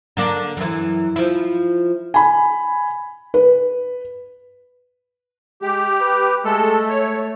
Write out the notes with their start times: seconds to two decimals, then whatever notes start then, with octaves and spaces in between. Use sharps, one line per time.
0.17 D3 A#3 D4
0.57 F#2 E3
1.16 F3 E4
2.14 G#5 B5
3.34 B4
5.62 G#3 G4
6.01 B4
6.45 G#3 A3 A4
6.89 C#5